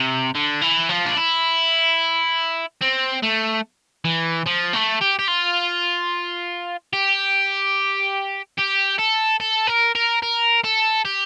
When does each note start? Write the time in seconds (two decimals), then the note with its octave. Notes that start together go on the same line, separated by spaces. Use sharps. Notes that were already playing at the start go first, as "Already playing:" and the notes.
Already playing: C3
0.35 D3
0.61 E3
0.89 F3
1.05 D4
1.17 E4
2.82 C4
3.23 A3
4.05 E3
4.46 F3
4.73 A3
5.01 G4
5.19 G4
5.28 F4
6.93 G4
8.58 G4
8.98 A4
9.40 A4
9.67 A#4
9.95 A#4
10.22 A#4
10.64 A4
11.05 G4